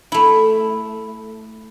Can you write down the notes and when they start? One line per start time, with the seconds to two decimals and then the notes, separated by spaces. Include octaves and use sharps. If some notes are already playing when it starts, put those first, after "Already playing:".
0.12 A3 E4